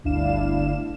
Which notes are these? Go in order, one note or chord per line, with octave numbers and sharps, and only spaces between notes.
G1 D2 D4 E4 F5 E7